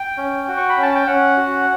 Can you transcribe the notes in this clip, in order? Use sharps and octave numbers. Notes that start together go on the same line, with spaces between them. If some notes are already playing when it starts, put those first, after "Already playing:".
Already playing: G5
C#4
F#4
C#6
B5
C#4
A5
G5
C#4 F#5
F#4